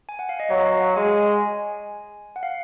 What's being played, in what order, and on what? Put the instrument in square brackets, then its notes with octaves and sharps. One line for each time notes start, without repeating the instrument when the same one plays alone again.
[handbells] G#5
F#5
F5
D#5
[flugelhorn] F#3 [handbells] C#5
[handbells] F5
F#5
[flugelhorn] G#3 [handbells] G#5
[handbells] F#5
F5